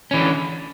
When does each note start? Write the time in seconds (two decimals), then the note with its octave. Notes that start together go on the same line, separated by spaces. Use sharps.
0.11 C#4
0.14 E3
0.16 D3